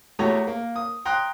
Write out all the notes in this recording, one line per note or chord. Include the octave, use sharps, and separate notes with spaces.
E2 A3 F#4 G4 C#5 A#5
A#3
D#6
G5 A#5 C6 D#6 F#6